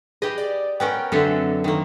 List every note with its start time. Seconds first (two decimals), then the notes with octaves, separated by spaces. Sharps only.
0.22 G4 G#4 B4 D#5
0.38 D5
0.80 B3 C#4 A#4 G5
1.12 F#2 D3 F#3 C4 A4 E5
1.64 D#3 A#3